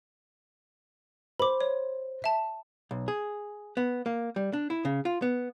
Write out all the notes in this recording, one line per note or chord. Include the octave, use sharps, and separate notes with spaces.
C5 B5 D6
C#5
E5 A5
B1
G#4
B3
A#3
G3
D4
E4
C#3
F4
B3